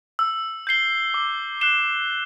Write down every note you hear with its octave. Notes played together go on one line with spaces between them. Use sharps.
E6
G6 C7 G7
D6
F#6 C7 E7 G7